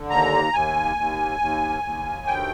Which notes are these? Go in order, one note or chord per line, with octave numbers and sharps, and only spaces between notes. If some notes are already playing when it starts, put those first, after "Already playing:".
Already playing: D3
D#2 A#5
D#2 G#5
D#2
D#2
D#2
D2 G5